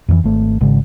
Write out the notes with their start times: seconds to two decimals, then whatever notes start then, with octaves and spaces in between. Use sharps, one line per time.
0.08 F2 D3 E3
0.24 G#1 A3
0.61 G#1 C#3 G#3